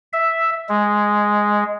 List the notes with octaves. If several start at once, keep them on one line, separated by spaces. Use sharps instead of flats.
E5
G#3